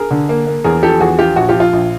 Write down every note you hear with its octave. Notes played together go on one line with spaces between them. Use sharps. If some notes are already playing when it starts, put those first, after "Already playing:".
Already playing: G#4 A#4
D3
A#3
A#3
E2 G#4 A#4
F3 G4 A4
E2 F#4 G#4
F3 F4 G4
A#1 F#4
F4 G4
F3
F4
A#1